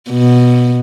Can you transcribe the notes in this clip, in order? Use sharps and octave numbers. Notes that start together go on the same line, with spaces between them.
B2